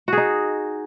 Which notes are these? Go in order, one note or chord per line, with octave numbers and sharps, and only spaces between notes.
D#4 F#4 G#4